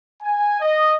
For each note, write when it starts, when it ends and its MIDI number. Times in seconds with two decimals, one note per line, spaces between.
0.22 0.58 80
0.61 0.94 75